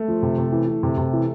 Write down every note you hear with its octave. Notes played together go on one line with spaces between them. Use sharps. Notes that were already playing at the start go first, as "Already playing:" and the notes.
Already playing: A3
F3
C3
C3
E3
E3
C3
C3
E3